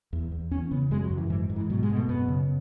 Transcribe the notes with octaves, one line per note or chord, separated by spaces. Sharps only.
E2
E2
E2 C#4
C#3 B3
F#2 G#3
F#3
F#2
E3
G#2 E3
G#2
E3
B2 F#3
G#3
B2
A3
F#2 B3
C#3